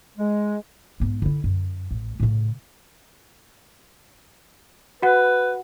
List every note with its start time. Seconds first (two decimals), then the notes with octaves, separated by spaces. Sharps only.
0.18 G#3
1.00 G#2 B3
1.22 D3 E4
1.44 F#2
1.91 A1
2.20 A2 C#3
5.02 F#4 B4 F#5